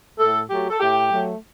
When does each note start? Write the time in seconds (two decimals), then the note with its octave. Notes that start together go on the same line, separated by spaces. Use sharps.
0.19 A2 A4
0.49 F#3 A3 G4
0.70 A4
0.79 A2 G4
1.11 F#3 A3